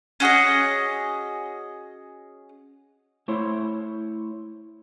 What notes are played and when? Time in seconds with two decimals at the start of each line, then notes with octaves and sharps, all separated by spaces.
0.20 C#4 F#4 G#4 D#5
3.28 A3 E4 C5 C#5